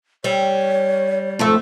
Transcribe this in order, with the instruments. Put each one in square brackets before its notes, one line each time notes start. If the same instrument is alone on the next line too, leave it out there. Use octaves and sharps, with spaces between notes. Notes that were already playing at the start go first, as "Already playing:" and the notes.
[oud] G3 [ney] C#5
[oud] F2 G#2 A3